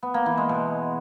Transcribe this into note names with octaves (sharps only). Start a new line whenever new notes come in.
B3
A#3
E3
G#3
B2